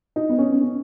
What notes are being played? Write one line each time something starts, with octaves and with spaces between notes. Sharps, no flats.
D#4
B3
C#4
B3
C#4